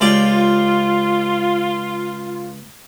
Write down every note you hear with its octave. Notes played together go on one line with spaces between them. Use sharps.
C#2 F4 G4 D5